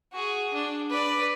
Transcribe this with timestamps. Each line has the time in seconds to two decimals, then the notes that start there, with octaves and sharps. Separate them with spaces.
0.13 F#4 G#4
0.54 D4
0.90 B4 D5